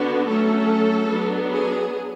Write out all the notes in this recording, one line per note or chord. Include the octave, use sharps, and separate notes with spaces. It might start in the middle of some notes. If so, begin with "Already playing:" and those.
Already playing: D3 B3 D4 F#4
F#3 A3 C#4 A4
F#3 B3 D4
G#4